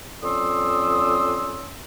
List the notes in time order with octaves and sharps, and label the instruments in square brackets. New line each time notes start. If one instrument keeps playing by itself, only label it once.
[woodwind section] F2 C#4 D5 C6 D#6 E6